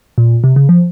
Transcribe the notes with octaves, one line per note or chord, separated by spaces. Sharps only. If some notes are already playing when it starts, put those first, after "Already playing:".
A#2
C3
C#3
F3